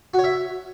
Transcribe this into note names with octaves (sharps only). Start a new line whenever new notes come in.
F#4
C#5
E5